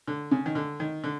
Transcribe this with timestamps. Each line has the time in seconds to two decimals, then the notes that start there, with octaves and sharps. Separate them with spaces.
0.08 D3
0.31 C#3
0.46 D#3
0.55 D3
0.80 D#3
1.04 D3